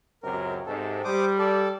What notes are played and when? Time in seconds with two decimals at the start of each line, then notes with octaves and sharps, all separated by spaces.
0.23 C#2 F#2 C3 A#4
0.66 G#2 C3 A4
1.04 G3 C5 D6 D#6
1.38 A4 D5